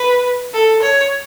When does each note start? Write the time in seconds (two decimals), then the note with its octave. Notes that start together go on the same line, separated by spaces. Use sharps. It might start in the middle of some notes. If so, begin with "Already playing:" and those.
Already playing: B4
0.53 A4
0.82 C#5